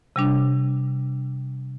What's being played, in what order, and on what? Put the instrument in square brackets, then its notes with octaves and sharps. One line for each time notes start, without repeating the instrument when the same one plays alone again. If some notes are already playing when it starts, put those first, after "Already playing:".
[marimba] C3 G3 D4